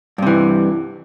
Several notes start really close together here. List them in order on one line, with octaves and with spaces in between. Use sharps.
G2 C3 E3